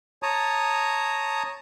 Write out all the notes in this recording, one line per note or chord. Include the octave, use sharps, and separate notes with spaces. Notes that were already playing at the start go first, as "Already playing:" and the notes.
C#5 A5 A#5 D#6